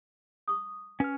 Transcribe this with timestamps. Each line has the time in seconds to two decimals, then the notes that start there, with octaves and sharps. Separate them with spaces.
0.48 C#6 D#6
1.00 C#4 B4 F6